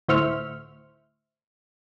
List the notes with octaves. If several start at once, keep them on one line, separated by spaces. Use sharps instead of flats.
D2 A2 C5 E5 C#6 F6